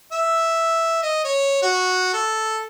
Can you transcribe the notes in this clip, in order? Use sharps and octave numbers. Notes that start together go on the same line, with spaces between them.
E5
D#5
C#5
F#4
A4